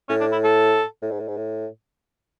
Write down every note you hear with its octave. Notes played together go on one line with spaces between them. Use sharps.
A2 C#4
D4
E4
A4
A2
G#2
A2
G#2
A2